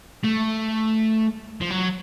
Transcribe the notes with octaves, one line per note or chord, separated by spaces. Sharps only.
A3
F3
F#3